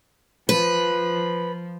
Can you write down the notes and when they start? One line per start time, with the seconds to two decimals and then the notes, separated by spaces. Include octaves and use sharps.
0.49 F3 B4